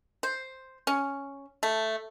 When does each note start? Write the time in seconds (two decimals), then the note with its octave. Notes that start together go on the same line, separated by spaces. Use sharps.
0.23 C5
0.87 C#4
1.63 A3